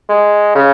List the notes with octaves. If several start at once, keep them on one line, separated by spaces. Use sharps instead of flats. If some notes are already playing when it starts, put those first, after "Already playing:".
G#3
C#3